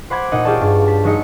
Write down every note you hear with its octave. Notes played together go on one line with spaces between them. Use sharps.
C5 F#5 B5 D6 G#6
A#2 D#4 D#5 F#5
F4 G4 G#4 C#5 D5 A5
G2
A5 B6
F#3 G#3 D#4 C#7